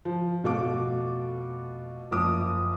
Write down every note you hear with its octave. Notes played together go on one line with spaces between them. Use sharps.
F3
F1 B2 F#4 A4 F5 D6
F#1 F3 D6 D#6